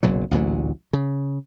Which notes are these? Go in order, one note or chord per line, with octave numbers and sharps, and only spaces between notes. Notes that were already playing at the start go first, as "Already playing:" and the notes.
F#1 B1 A#2 F#3
A1 D2 A#2 F#3
C#3